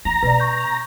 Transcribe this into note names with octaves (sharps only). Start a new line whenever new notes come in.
E3 A#5
B2 B4 D5
C#6 G6